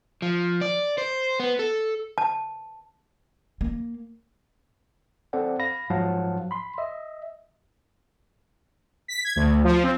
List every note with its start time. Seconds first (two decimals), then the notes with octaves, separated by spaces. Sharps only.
0.22 F3
0.61 D5
0.98 C5
1.40 B3
1.59 A4
2.18 A5
3.61 A#3
5.33 C4 A4 C5 D5 F#5
5.59 F5 B5 A#6
5.90 G#2 F3 F#3 F5 F#5 A5
6.51 B5 C6
6.78 D#5 E5
9.08 B6
9.24 G#6
9.36 D2
9.64 F3
9.84 C4